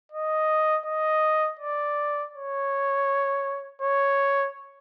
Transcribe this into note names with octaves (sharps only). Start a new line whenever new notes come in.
D#5
D#5
D5
C#5
C#5